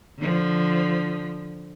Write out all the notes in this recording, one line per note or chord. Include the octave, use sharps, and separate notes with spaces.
D3 F3